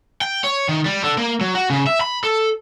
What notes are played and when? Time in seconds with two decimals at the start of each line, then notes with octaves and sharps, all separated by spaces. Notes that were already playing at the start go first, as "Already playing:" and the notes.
0.21 G5
0.44 C#5
0.69 D#3
0.86 G3
1.04 D3
1.18 A#3
1.41 F#3
1.55 F#4
1.70 C#3
1.87 E5
2.01 B5
2.24 A4